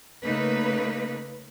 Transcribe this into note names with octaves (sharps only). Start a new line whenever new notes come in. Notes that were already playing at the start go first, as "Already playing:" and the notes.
C#3 A3 A#3 D#4 B4